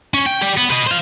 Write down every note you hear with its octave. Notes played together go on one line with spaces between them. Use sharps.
C#4
G5
G4 D5
B3
B4 D#5
C5 F5